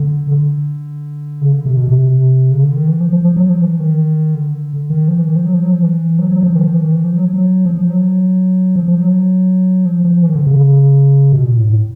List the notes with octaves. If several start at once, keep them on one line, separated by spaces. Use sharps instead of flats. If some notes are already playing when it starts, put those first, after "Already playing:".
Already playing: D3
D3
C#3
D3
C3
B2
C3
C#3
D3
D#3
E3
F3
F3
F3
F#3
F3
E3
D#3
D3
D#3
F3
E3
D#3
F3
F#3
F3
F#3
F3
E3
F#3
F#3
F3
D#3
F3
E3
D#3
E3
F3
F#3
F#3
F3
F3
F#3
F3
F3
F#3
F3
F3
E3
D#3
D3
C#3
B2
A#2
A2
A2